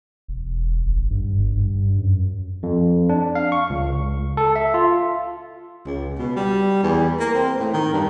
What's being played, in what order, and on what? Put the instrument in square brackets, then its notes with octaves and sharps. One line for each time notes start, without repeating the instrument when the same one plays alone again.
[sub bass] E1
G#1
G2
G1
G2
F#2
[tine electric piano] F2
D4
F5
C#6
C#2
A4
E5
F4
[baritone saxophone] C#2
B2
G3
E2
A#3
C4
A2
D#3
G2